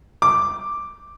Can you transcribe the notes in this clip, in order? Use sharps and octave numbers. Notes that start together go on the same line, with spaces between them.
D6